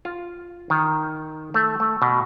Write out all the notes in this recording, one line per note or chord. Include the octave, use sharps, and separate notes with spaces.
F4
D#3
A3
A3
B2